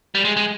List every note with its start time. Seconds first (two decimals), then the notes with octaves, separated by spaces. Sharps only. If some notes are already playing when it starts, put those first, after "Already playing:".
0.15 G3
0.25 G#3
0.37 G#3